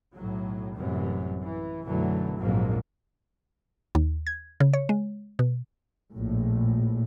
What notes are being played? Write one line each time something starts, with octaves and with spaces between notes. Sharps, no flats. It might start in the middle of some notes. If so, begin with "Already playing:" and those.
B1 A2 F#3
A1 F#2 C3 E3 G3
E3
B1 F#2 D3 E3 F#3 A3
A#1 F2 G#2 F#3 A#3
D#2
G#6
C#3
C#5
G#3
B2
A#1 A2